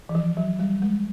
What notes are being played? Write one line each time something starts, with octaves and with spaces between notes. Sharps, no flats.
E3
F3
F#3
G3
G#3